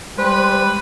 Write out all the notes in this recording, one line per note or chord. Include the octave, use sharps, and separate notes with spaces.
G3 G#3 B4 C5 B5